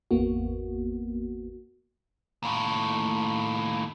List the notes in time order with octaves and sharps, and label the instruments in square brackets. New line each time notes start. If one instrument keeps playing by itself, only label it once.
[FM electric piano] G#1 E2 A#3 B3 F#4
[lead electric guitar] D#2 A2